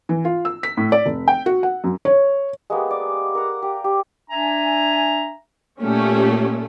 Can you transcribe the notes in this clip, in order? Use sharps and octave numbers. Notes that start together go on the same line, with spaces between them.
E3
F4
E6
B6
A2
D5
F1
G5
F#4
F#5
F#2
C#5
G#3 A#3 B3 G4
D5
A#4 F#5
G4
G4
D4 E5 G#5 A#5
A#2 A3 C#4 G4